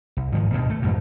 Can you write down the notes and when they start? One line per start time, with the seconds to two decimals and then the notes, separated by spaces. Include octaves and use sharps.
0.17 C2
0.32 G#2 D#3 F3
0.52 D2 G2 B2
0.70 A3
0.82 F2 G#2 B2